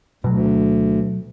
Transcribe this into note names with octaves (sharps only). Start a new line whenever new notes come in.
D2 B2 F#3